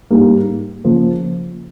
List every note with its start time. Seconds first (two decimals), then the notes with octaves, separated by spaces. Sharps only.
0.11 G#2 G3 A#3
0.84 C#3 F3 A#3